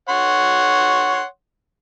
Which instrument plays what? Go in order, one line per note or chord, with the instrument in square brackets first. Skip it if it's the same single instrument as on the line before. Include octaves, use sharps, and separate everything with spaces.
[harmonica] C#5 F#5 C6